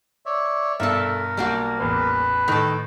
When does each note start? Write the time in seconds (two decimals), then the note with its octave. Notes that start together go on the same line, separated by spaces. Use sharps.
0.26 C#5 D5 E5
0.80 G2 B2 A4 A#4 D5 E5
1.37 B1 G3 A#3 F#4
1.80 A1 E2 B4
2.48 A2 D#3 A4 D#5